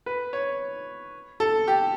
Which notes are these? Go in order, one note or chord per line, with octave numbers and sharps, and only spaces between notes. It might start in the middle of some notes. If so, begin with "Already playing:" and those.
B4
C#5
A4
G4